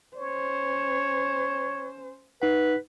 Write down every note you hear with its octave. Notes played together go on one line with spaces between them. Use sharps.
C#4 C5 C#5
D#4 B4 F#5